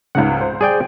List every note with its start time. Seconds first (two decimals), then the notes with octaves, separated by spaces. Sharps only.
0.15 C#2 G#2 C#3 F#5
0.41 C5
0.61 G#4 D5 G5